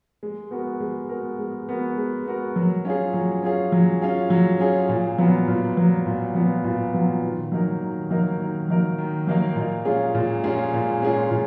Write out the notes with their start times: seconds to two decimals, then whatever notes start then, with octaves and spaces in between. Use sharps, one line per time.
0.23 G#3
0.51 B3 F#4 A#4
0.81 G#3
1.09 B3 F#4 A#4
1.39 G#3
1.69 B3 F#4 A#4
1.98 G#3
2.26 B3 F#4 A#4
2.56 F#3
2.85 C#4 F4 G#4
3.14 F#3
3.43 C#4 F4 G#4
3.72 F#3
4.02 C#4 F4 G#4
4.30 F#3
4.59 C#4 F4 G#4
4.89 A#2
5.18 F#3 B3 F4
5.48 A#2
5.77 F#3 B3 F4
6.06 A#2
6.35 F#3 B3 F4
6.64 A#2
6.93 F#3 B3 F4
7.23 D#3
7.52 F#3 A#3 D#4 A#4
7.81 D#3
8.10 F#3 A#3 D#4 A#4
8.39 D#3
8.68 F#3 A#3 D#4 A#4
8.98 D#3
9.27 F#3 A#3 D#4 A#4
9.56 A#2
9.85 G#3 C#4 F4 G#4
10.15 A#2
10.44 G#3 C#4 F4 G#4
10.73 A#2
11.02 G#3 C#4 F4 G#4
11.31 A#2